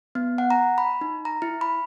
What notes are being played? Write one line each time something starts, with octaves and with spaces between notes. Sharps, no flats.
B3
F#5
A#5
B5
D#4
A#5
E4
B5